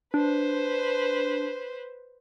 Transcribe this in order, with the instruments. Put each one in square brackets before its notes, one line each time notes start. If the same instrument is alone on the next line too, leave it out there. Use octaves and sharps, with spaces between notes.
[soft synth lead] D4 [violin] B4 C5